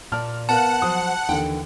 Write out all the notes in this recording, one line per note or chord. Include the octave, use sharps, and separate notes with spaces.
A#2 D5 A5 F6
B3 A#4 F5 F#5 A5
F3 F#3 C5 D#6
D#2 D3 E3 G5